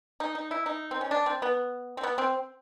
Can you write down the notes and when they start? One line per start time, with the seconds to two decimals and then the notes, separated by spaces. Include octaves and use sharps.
0.20 D#4
0.35 D#4
0.51 E4
0.66 D#4
0.91 C4
1.01 C#4
1.11 D4
1.26 C4
1.42 B3
1.97 C4
2.03 B3
2.18 C4